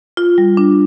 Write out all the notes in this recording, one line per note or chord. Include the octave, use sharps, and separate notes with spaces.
F4
G3
D4